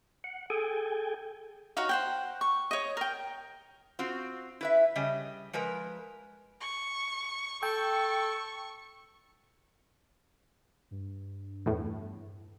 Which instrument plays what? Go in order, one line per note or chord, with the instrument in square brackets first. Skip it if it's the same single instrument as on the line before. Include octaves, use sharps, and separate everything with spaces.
[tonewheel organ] F#5
G#4 A4 G5 G#5
[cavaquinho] D#4 F#4 C#5 F5
C5 F#5 G5
C#6
C#5 D#5
A#4 G5
[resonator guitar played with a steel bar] C4 F4 F#4
E4 B4 E5
C#3 G3 D#5
F3 G#3 A#4 B4
[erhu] C#6
[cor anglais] A4 [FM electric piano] G5 [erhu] C#6
[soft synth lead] G2
[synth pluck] E2 A2